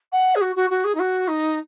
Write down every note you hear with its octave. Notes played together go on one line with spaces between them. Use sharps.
F#5
G#4
F#4
F#4
F#4
G#4
D#4
F#4
D#4